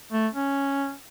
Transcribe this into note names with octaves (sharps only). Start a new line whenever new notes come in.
A3
C#4